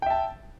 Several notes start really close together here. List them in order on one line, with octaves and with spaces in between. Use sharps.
G5 E5 A5